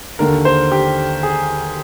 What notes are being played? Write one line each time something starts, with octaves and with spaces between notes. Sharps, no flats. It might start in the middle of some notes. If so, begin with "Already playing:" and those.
D#2 D3 A#4
C5
G4
G#4